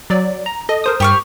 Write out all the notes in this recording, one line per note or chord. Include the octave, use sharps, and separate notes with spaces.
F#3 D5
A#5
A4 D#5
A#4 C5 D#6
G2 G4 C#6 F6